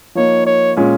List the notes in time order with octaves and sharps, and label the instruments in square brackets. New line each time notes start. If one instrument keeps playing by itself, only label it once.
[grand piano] F3 A#3 D#4 [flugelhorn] C#5
[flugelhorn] C#5
[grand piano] A#2 G#3 C#4